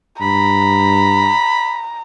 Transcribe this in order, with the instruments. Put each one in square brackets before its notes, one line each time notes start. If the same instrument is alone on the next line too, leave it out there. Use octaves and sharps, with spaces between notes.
[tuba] G2 [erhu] A#5 [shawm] B5